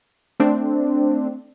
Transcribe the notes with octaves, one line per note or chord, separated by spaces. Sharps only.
A3 C4 D4